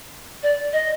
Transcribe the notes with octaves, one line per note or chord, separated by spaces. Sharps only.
D5
D#5